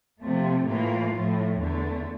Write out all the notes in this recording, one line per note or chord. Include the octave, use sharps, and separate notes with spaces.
C3 F3 A3
A2 E3 A#3 F4
A2 F3 A3
E2 D3 A3